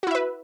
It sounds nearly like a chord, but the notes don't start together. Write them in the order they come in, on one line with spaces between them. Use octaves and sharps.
F#4 E4 E5 B4